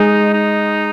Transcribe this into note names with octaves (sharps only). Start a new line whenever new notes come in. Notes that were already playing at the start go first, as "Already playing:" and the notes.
Already playing: G#3 D#4
D#4